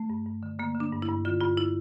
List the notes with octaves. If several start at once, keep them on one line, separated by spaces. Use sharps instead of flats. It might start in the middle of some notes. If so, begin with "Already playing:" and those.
Already playing: A3
G2
G2
D3
D3 A#3
D3
D4
G2
E4
G2
D3 F4
G2 F4
E4